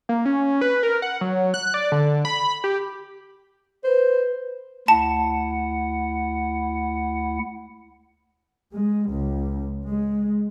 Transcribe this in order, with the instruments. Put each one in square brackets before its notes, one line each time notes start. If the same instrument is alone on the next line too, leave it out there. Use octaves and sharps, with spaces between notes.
[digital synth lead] A#3
C#4
B4
A#4
F#5
F#3
F#6
D5
D3
B5
G4
[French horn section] B4 [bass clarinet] C5
[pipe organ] D2 E4 F#5 [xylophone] A5
[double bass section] G#3
C#2
G#3